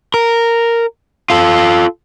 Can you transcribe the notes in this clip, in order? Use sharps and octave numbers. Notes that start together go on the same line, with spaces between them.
A#4
F4 A4